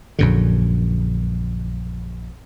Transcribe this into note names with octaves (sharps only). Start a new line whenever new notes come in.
A#1 F#2 D3